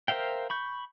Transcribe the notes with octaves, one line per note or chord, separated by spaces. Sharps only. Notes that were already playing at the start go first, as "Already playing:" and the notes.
A#4 C5 E5 F5 G5
B5 C#6 G6